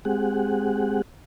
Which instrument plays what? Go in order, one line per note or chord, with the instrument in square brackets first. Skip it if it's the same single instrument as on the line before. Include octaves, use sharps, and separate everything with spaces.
[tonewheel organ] G#3 C4 G4 G#4 F#5